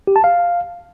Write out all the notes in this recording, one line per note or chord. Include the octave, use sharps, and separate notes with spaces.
G4
A5
F5